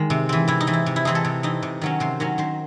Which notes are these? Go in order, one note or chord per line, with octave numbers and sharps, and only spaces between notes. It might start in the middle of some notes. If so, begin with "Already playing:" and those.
Already playing: D#3 G#3
C3
E3 C4
C3 E4
D#4
E3 C4
E4
C3
E4
E3 C4 D#4 G#4
A4
C3
E3 C4 D#4
C3
D#3 F#3 C#4
C3 C5
D#3 F#3 C#4
D#3 C5